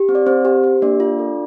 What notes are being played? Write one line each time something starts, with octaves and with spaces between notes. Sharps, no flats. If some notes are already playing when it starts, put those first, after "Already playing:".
Already playing: G4
C4
D5
C4 C5
G4
G4
A#3 D4 D5
F4
A4